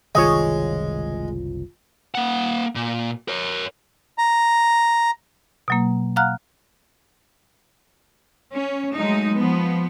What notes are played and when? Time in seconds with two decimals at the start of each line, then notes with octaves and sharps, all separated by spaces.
0.15 F#1 C2 D#3 G#3 F4 C#5 D#5
2.15 A#3 F#5
2.75 A#2
3.28 A#4 C#5
4.18 A#5
5.68 B2 F#3 A#3
6.16 F5 F#5 A#5 F6 F#6
8.53 C#4
8.95 F#3 G#3 A3 D#4
9.35 F3 B3